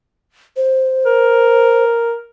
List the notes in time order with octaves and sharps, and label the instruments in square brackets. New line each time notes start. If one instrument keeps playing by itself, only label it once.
[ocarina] C5
[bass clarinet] A#4